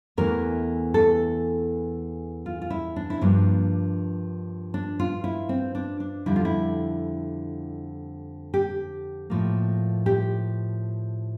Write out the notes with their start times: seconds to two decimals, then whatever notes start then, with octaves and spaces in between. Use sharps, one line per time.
0.17 E2 E3 A3 A#4
0.94 A4
2.46 F4
2.62 F4
2.70 E4
2.96 D4
3.10 E4
3.21 G2 F3 A#3 D4
4.74 D4
5.00 F4
5.24 E4
5.49 C4
5.75 D4
6.00 D4
6.26 F2 D3 G3 E4
6.36 F4
6.45 E4
8.54 G4
9.30 A2 F3 A#3
10.06 G4